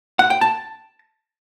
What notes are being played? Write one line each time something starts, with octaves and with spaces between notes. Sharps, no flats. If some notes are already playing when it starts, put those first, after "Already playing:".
F#5
G5
A5